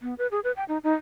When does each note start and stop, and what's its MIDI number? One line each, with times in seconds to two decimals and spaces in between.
0.01 0.14 59
0.18 0.27 71
0.31 0.40 68
0.44 0.52 71
0.56 0.64 79
0.68 0.78 63
0.84 0.93 63